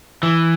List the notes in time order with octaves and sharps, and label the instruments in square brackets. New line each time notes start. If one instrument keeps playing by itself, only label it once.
[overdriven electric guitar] E3